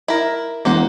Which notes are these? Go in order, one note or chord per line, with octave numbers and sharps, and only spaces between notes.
E4 A#4
E1 A#3 C5 F#5